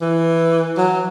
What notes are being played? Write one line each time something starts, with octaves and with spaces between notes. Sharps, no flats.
E3
F#3